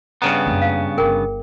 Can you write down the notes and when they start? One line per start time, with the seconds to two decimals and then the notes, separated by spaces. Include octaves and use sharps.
0.22 G2 C#3 B3 B4 G#5 A#5
0.47 F#2 A#3
0.62 F5
0.98 G1 G#4 A#4 G5